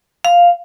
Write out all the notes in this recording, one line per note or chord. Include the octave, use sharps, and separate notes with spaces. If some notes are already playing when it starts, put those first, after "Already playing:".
F5